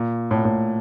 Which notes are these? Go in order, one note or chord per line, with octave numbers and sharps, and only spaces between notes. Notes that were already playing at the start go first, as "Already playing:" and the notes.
Already playing: A#2
A2
A#2
A2